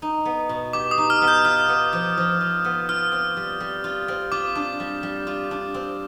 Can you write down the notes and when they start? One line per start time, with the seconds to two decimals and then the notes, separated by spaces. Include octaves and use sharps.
0.02 D#4
0.25 B3
0.49 B2
0.73 G4 D6
0.91 D#6
0.98 D#4
1.10 F6
1.22 B3
1.28 G6
1.45 F4 F6
1.68 B3
1.93 F3
2.17 F3
2.41 F4
2.64 B3
2.89 F4 F6
3.12 C4
3.37 G3
3.60 G3
3.84 F4
4.08 C4
4.32 F4 D6
4.55 D4
4.80 G3
5.03 G3
5.27 F4
5.51 D4
5.74 C4